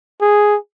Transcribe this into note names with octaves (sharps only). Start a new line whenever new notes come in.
G#4